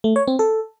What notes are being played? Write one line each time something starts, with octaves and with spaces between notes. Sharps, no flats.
A3
C#5
C4
A4